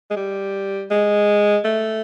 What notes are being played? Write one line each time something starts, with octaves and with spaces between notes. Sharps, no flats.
G#3
G3
G#3
A3